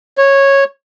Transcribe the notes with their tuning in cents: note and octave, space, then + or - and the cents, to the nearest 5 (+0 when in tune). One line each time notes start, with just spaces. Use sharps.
C#5 -10